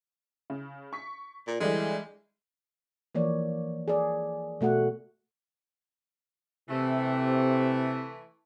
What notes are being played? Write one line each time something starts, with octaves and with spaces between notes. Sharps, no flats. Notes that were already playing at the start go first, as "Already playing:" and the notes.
C#3
C#6 B6
A#2
D3 E3 G3 G#3
E3 F3 A#3 C#5 D5
G#4 D5
B2 A3 F#4 F#5
C3 E3 A3